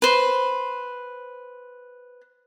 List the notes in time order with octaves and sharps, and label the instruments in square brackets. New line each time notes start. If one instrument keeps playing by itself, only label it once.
[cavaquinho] B4 C5